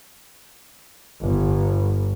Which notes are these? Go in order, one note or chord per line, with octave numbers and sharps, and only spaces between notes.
G1